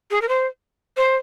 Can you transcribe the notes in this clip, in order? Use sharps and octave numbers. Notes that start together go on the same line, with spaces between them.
G#4
A#4
C5
C5